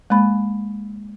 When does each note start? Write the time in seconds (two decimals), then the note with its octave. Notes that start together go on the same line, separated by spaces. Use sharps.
0.10 G#3 A#3 B5